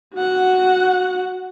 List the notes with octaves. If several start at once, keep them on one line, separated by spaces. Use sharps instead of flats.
F#4 F#5